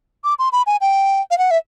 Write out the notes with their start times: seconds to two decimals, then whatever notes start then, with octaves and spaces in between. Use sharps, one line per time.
0.24 D6
0.39 C6
0.52 B5
0.67 G#5
0.81 G5
1.31 F5
1.38 F#5
1.51 E5